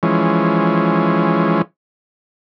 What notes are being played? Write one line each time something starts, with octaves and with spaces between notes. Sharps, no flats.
E3 F3 G#3 C#4